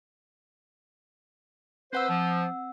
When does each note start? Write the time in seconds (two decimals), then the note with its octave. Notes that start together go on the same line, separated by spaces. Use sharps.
1.93 C4 B4 C5 F#5 E6
2.09 F3